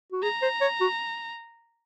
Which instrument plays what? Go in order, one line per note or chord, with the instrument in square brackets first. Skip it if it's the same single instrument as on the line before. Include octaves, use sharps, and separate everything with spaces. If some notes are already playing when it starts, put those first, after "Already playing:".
[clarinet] F#4
[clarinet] G#4 [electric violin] A#5
[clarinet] C5
C#5
F#4